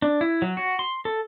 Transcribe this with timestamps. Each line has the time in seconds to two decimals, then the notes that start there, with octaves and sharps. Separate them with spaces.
0.02 D4
0.21 E4
0.42 F#3
0.57 F#4
0.79 C6
1.05 A4